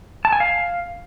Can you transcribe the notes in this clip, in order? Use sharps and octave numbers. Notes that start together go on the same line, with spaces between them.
A5
G#5
F5